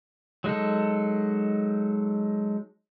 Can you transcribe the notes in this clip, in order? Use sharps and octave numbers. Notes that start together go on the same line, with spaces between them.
F#3 G#3 D#4 A4